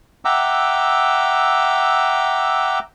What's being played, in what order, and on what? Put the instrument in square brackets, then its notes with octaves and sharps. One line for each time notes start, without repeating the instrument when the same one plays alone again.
[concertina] E5 F#5 G5 A#5 D6 E6